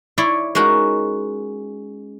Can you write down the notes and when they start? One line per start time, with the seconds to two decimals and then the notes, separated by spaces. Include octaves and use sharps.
0.18 E4 C#5 D5 C6
0.55 G#3 C#4 D#4 F#4 A#4